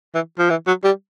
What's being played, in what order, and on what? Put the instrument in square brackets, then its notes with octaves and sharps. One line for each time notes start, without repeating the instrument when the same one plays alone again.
[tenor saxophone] E3
F3
E3
F#3
G3